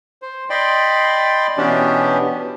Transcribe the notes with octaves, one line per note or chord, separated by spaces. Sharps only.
C5
D5 D#5 G5 B5 C6
B2 E3 B3 C#4 D4 G4